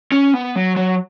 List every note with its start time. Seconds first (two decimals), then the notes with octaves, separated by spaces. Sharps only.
0.12 C#4
0.34 B3
0.56 F#3
0.76 F#3